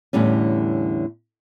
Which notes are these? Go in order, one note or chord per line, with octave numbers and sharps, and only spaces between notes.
E2 A2 D3 G3 C#4